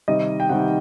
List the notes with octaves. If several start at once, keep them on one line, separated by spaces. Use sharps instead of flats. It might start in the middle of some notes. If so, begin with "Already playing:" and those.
C3 D#3 G3 D#5
G5
C3 D#3 G3 F#5